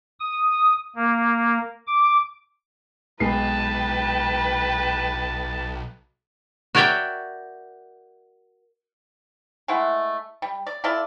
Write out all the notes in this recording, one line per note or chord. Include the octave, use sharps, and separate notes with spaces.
D#6
A#3
D6
B1 G#3 B3 B4 G5 A5 C7
F#4 A#4 C#5 D5 E5 G5
G#3 A3 E4 F#5
G3
D5
E4 F4 A4 D5